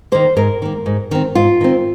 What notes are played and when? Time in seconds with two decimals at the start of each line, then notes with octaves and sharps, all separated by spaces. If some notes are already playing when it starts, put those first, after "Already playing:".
0.12 D#3 A#3 C5
0.36 G#2 A#4
0.62 D#3 A#3
0.86 G#2
1.11 D#3 C4
1.35 G#2 F4
1.61 D#3 C4